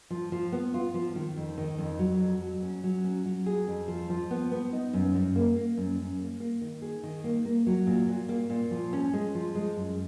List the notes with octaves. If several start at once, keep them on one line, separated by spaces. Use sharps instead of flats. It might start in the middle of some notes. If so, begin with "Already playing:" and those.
F3
F3
B3
F4
F3
D#3
F2
D#3
F2
F#3
F2
F#3
C#4
F#3
C#4
F#3
G#4
F2
F3
F3
B3
B3
D#4
F#2
F#2
A#3
A#3
F#2
F#2
A#3
A#3
D#3
G#4
D#3
A#3
A#3
F#3
A#2
A#2
A#3
A#2
F3
C#4
G#3
F3
G#3
F#2